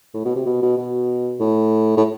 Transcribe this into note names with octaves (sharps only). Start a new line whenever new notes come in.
A2
B2
C3
B2
B2
B2
A2
A2